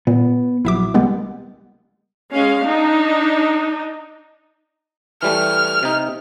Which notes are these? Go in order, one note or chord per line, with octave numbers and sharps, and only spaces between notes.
A#2 B3
A#1 F#3 E4 E5 D6
C2 G3 G#3 A#3 B3
G#3 C#4 F5
D4 D#4
E3 G3 A3 F6
C3 D#4